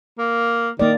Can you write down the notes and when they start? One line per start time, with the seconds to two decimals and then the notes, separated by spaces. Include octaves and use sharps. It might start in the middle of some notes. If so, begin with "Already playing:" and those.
0.18 A#3
0.79 D#3 A#3 D5